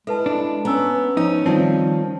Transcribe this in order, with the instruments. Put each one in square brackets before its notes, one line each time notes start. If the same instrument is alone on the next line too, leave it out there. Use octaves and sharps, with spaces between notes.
[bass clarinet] G#3 [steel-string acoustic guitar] E4 [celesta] A4 B4 A5
[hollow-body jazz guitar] D4
[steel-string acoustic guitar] B3 [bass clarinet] C#4 [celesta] A#5 E6
[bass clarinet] F3 [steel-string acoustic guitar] C#4 [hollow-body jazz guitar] D#4
[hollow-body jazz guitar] D#3 F3 C4 [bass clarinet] G3 [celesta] A5